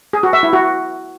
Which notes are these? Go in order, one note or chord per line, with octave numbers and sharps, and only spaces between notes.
G#4
F#4
E5
E4
F#4